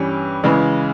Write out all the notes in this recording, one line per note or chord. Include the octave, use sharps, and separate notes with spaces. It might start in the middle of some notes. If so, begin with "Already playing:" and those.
Already playing: G2 E3 G3 C#4
C#3 E3 G#3